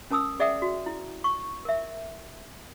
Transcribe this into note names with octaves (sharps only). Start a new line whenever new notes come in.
C#4 A#4 A5 D#6 E6
G#4 D5 E5 F#5 G5 D#6
F#4
E4
C#6
A#4 E5